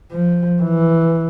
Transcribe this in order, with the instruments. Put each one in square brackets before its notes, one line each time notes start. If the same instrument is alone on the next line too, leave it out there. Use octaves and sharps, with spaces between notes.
[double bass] F3
E3